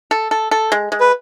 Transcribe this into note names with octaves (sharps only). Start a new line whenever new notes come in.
A4
A4
A4
G#3
G#3
B4